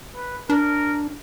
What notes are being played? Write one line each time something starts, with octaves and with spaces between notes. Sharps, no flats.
B4
D4 A#4